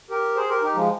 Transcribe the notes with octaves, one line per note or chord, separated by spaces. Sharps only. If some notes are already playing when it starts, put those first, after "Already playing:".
G4 A#4
G#4 C5
G4 A#4
D#4 G4
F3 G#3